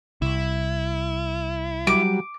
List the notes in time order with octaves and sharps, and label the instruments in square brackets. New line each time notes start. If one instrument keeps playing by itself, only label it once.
[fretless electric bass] C2 [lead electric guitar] E4
[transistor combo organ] F#3 G3 [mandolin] D6